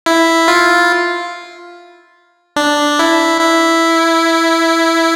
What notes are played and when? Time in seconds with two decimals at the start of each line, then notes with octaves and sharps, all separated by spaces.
0.06 E4
0.48 F4
2.56 D4
2.99 E4
3.41 E4